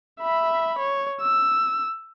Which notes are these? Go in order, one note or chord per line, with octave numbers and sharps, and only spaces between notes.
E5 B5
C#5
E6